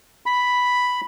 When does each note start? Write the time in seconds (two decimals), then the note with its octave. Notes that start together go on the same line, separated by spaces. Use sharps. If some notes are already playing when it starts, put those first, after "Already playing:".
0.26 B5